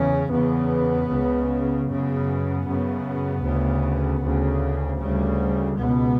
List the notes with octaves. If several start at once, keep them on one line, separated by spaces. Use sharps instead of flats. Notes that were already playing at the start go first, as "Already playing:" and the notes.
Already playing: E2 C#3 C#4
E2 C#3 B3
C#2 C#3
F#2 C#3 B3
F#2 C#3
D2 C#3
D2 C#3
D2 C#3 G3
C#2 B2 B3